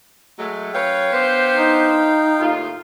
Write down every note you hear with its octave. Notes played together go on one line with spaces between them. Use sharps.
F#3 G#3 A3
F#2 B4 C#5 F5 G5
B3 D4 C5
D#4
D#2 A2 F4